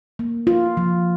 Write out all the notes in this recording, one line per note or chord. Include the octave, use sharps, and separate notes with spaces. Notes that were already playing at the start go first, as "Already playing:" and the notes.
A#3
F4
F3